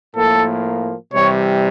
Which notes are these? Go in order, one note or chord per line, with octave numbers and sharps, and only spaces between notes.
A2 F3 A#3 A4
C3 E3 G3 C#5